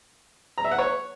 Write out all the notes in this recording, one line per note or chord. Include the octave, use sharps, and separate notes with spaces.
A#5
E5
F#5
C#5